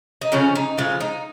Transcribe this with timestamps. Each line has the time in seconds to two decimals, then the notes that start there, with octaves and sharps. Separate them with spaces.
0.21 D#4
0.32 C#3 F3 G#3 C#4
0.55 D#4
0.77 C#3 F3 G#3 F4
1.00 D#4